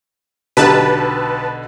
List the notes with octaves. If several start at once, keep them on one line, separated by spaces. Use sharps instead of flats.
B1 B2 D3 G4 B4 A5 A#5